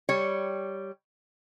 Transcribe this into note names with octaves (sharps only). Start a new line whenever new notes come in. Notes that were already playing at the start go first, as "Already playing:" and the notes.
G3 C#5